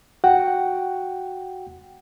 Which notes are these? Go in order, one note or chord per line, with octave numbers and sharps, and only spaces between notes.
F#4 F#5 G5